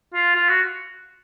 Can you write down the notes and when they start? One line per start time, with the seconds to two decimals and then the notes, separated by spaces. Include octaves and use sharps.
0.14 F4
0.35 F4
0.49 F#4